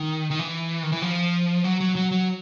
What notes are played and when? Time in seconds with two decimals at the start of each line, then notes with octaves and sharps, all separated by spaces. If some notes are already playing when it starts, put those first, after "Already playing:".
Already playing: D#3
0.31 D#3
0.39 E3
0.83 D#3
0.92 E3
1.02 F3
1.64 F#3
1.81 F#3
1.96 F#3
2.11 F#3